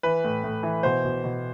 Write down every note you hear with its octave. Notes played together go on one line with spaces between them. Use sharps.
E3 B4
A2
A2
E3
B2 C5
B2
B2